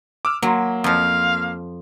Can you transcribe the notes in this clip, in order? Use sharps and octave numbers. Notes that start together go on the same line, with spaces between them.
D6 E6 F6
F#3 A#3 C6
F2 F3 F5